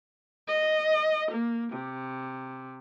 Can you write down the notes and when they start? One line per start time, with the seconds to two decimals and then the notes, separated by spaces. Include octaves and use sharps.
0.47 D#5
1.30 A#3
1.71 C3